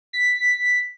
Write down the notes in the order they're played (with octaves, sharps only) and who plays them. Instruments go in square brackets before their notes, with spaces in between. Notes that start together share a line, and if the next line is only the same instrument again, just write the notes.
[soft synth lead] B6